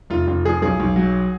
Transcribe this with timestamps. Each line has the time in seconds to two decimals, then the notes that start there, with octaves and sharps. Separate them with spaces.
0.10 F1 F4
0.27 F1 F4
0.45 F3 G#4
0.62 B1 G#4
0.80 B1
0.96 F#3